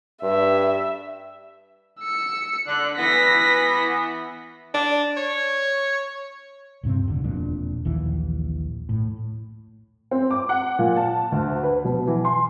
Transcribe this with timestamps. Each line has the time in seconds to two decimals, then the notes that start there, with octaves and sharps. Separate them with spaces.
0.23 G2 E5
2.00 E6 C#7
2.67 D3 F#6
2.98 E3 B3 A#6 B6
4.74 D4
5.17 C#5
6.83 D1 G2 C3 C4
7.08 E1 D3
7.24 E1 F2 A#2 D4
7.85 A#1 D#2 E3
8.89 A2
10.11 C4
10.31 D6
10.49 F#5
10.79 A#2
10.96 A5
11.32 D2
11.63 B4
11.85 B2
12.07 E3
12.25 C6